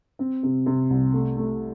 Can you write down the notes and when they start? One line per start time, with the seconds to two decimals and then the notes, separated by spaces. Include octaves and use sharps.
0.19 C4
0.43 C3
0.66 C3
0.90 C2
1.13 A3
1.37 A3